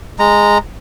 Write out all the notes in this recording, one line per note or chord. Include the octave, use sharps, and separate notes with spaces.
G#3 A#5